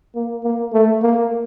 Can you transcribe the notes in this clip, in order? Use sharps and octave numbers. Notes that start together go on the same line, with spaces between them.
A#3
A#3
A3
A#3